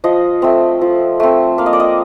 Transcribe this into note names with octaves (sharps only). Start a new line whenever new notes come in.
F3 D#5
A3 C4
F3
A3 C4
A#3 F5
D#5
D5
D#5